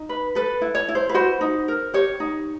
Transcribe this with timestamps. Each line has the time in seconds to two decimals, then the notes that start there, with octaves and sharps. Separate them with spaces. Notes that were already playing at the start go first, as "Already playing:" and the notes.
Already playing: D#4
0.09 B4
0.35 A4 B4
0.61 E4
0.75 C#5
0.88 E4
0.95 C5
1.09 B4
1.14 F#4 C5
1.41 D#4
1.68 A#4
1.94 G4 C#5
2.20 D#4